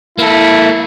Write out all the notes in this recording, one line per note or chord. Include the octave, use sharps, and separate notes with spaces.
A#3 E4 A4